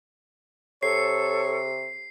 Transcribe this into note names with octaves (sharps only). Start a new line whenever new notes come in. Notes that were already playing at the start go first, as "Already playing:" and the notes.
C3 A4 C#5 C7